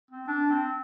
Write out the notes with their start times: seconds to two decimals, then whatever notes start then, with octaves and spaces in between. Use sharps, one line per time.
0.11 C4
0.27 D4
0.50 C4